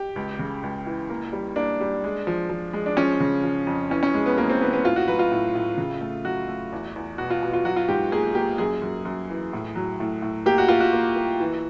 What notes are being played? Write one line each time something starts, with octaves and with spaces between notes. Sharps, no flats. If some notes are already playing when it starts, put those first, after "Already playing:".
Already playing: G4
C#2
C#3
C#2
E3
A#3
G3
A#3 D4
G3
G#3
F3
F3
G#3
D4
F3 C#4
C#3
F3
F2
E3 C#4
C#4
G#3
B3
E3 A#3
C4
E3 B3
B3
A2 F4
F#4
F#3 B4
F4
A2
A2
C#3
A3
F#3 F#4
A3
E2
E2
B2 F#4
F4
B2
F4
F#3 F#4
F4
G#2 G4
A#3 G#4
A#3 G4
F#2 G#4
F#2
F#2
E3
A2
F#3
A2
A2
A#3 G4
F#4
A#3 F4
F#4
A#3
A#3
E3